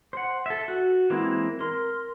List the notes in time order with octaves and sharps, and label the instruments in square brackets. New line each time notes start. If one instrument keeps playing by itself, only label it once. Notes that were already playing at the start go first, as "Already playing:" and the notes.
[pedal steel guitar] C5 F#5
A4 E5
F#4
E3 G#3 A#3 C4 E4
A#4 C6